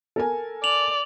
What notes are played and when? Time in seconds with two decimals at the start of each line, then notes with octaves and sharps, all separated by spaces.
0.16 A4 A#4 G#5
0.64 D5 F7 F#7